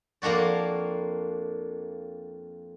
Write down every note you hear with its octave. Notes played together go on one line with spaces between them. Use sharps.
F2 A#3 D4 F#4 D5